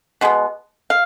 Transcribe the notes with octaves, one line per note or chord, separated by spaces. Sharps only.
B2 G#3 B3
F5